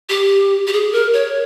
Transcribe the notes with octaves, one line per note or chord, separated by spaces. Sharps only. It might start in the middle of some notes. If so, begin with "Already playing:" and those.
G4
G4
G#4
A#4
C#5